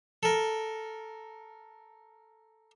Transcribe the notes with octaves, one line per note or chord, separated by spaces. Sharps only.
A4 A#4